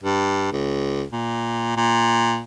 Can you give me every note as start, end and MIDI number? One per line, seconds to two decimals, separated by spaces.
0.04 0.52 43
0.52 1.04 37
1.12 1.76 46
1.77 2.41 46